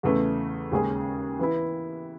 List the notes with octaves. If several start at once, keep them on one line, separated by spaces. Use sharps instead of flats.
E2 C#3 E3 A3
D#2 C#3 G#3 C#4 G#4
E3 B3 E4